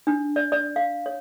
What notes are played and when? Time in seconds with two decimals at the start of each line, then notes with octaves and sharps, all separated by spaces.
0.07 D4
0.36 D5
0.52 D5
0.76 F5
1.06 C#5